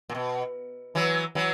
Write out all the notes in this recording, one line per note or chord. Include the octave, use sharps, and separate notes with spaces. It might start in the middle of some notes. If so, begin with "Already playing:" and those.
A#2
B2
E3 F#3
E3 F#3